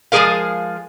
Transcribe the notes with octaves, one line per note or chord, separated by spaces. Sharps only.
F3 G#3 D#4 G#4 A#4 F5